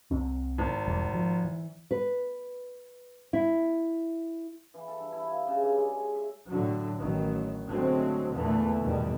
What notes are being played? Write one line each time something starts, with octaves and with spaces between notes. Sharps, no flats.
C2 C3 C4
G#1
E1 E2 G3
F3
E3
B4
E4
E3
A4
G2
E4
F4
C#3
G2
G#3
G#5
E5
A2 D3 F#3
A1 D#3 F#3
D3 F#3 G#3 A3 C4
E2 A#2 D3 E3 A3 B3
E2 G#2 B2 D#3 G3